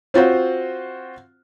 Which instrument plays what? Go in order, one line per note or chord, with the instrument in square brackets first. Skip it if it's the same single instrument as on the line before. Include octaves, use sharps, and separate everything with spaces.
[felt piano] C4 F4 F#4 C5